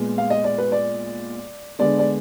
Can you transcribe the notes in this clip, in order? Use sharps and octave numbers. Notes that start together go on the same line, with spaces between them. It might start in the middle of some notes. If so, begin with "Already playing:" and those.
Already playing: A#2 G#3 B3
F5
D#5
D5
B4
D5
D3 G#3 B3 D5
D5